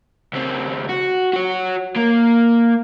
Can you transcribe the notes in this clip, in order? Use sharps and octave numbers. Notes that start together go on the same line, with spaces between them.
C#2 C4
F#4
F#4 C#5
A#3